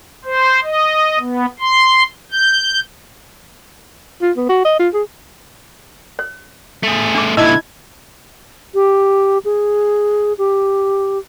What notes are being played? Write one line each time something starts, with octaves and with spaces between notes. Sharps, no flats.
C5
D#5
B3
C6
G6
F4
B3
F#4
D#5
F4
G#4
C#5
A3 G#4
D4 D6
A#2 D3 D#4 E4 D#5 E6 G#6
G4
G#4
G4